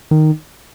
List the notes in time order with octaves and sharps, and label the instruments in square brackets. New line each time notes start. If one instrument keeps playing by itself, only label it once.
[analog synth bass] D#3